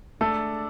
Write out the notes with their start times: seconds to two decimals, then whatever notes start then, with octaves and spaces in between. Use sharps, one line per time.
0.21 D3 G#3 A3 D4 A4